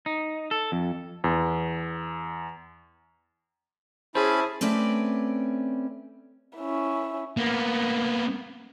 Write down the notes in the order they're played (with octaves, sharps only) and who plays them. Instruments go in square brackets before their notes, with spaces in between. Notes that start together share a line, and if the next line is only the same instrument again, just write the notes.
[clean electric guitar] D#4
A4
F2
[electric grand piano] E2
[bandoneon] C#4 B5 [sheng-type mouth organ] E4 A5 [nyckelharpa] G#4 [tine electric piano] C5
[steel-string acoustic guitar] A3 C4 C#4 B4 D5
[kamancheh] C#4 E4
[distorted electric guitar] A#3 B3